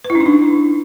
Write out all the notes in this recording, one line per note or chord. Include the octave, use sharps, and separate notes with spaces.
B4
E4
C#4
D#4
D4